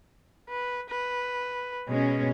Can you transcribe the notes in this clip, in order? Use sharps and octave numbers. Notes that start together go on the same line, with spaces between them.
B4
B4
B2 G#3 C#4